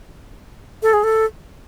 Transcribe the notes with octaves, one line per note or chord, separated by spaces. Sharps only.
A4
G#4
A4